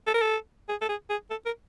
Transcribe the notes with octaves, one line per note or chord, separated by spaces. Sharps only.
A4
A#4
A4
G#4
A4
G#4
G#4
A4
A#4